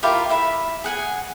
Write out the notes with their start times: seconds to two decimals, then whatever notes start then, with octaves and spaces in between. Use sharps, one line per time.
0.03 E4 F4 G4 A#4
0.29 E4 E5 B5
0.84 G#4 F#5 G#5